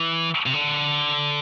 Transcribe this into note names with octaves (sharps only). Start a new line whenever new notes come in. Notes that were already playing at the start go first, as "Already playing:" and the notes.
Already playing: E3
C3
D3